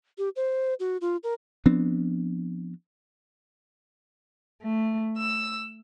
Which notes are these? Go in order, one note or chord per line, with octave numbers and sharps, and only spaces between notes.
G4
C5
F#4
F4
A#4
F3 B3 C4 D4
A3
E6